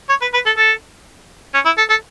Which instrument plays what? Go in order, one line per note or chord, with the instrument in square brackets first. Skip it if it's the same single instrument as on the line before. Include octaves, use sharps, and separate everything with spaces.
[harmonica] C#5
B4
B4
A4
A4
C#4
E4
A4
A4